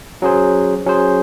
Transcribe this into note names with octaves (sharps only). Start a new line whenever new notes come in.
F#3 C#4 G#4 C5
F#3 C#4 G#4 C5